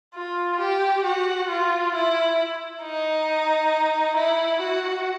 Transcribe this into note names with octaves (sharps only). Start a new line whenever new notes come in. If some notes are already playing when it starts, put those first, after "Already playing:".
F4
G4
F#4
F4
E4
D#4
E4
F#4